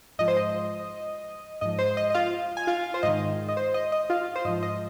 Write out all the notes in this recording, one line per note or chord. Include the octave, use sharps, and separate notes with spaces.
G#2 F3 D#5
C5
D#5
G#2 F3 D#5
C5
D#5
D#5
F4 F5
G#5
F4 F5
C5
G#2 D#3 D#5
D#5
C5
D#5
D#5
F4 F5
C5
G#2 F3 D#5
D#5